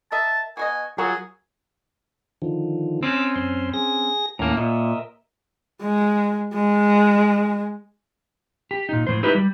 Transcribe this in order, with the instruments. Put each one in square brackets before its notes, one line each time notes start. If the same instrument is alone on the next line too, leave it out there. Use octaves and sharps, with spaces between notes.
[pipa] A#4 D#5 E5 [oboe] A5
[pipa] B2 F#4 D#5 [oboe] G#5
[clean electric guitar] F#3 F4 F#4 [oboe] G#4 [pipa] A#4 C#5 F#5
[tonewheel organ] D3 D#3 F3
[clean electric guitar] C4 C#4 [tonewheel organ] D6 E6
[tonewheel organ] F#2 C5 C6
G#4 A#6
[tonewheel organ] D#2 C#4 A#5 [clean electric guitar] A2 A#3
[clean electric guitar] A#2 [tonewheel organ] A#4 D#5 E5
[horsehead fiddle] G#3
G#3
[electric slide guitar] G4
A#2 D#4
A2 F3 C5
D#4 E4 F#4 G4 B4
G3